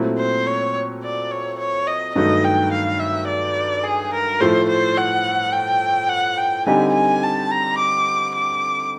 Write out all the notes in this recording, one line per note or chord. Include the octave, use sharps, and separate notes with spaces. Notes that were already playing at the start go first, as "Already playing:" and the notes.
Already playing: A#2 F#3 A3 C4 E4
C5
C#5
D5
C#5
C#5
D#5
G2 D#3 F#3 A3 D#5
G5
F5
E5
D5
G#4
A#4
A2 F3 A3 C5
C5
F#5
G5
F#5
G5
D3 G3 C4 D#4 G4 G#5
G#5
A5
A#5
D6
D6